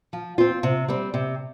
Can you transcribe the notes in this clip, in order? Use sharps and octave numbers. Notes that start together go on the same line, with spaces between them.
F3
C4 F4
C3
G3 C4
C3